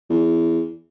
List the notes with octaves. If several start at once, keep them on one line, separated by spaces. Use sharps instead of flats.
E2